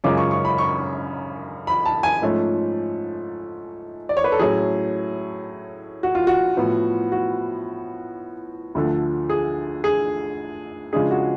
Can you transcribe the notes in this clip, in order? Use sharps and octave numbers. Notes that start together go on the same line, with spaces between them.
F#2 C#3 G#3 C#4 F4 D6
C#6
C#6
B5
C#6
B5
A5
G#5
G#2 F3 A3 C#4
D5
C#5
B4
A4
A2 F#3 A3 C#4 G#4
F#4
F4
F#4
A2 F3 B3
F#4
D2 D3 F3 A3
G#4
G#4
C#3 F3 G#3 D4 G#4
F#4